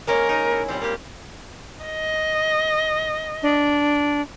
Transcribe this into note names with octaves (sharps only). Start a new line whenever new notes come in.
G#3 A#3 C#4 A#4
D#4
E4
A#2 G3 C4
A#3 G4
D#5
D4